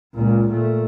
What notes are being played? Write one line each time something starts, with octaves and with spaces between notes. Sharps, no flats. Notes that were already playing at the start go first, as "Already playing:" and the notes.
C#2 A#2
A#2 A3